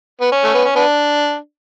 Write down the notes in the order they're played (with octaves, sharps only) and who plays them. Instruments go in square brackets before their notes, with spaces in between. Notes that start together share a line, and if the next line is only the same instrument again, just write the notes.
[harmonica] B3
C#4
A3
B3
C#4
B3 D4